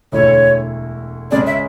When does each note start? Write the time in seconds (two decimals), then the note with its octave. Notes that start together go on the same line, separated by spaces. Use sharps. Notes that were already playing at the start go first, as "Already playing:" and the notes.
0.12 E1 D2 D3 A3 E4 C#5
1.31 C#2 C#3 G#3 C#4 G#4 D5
1.47 E5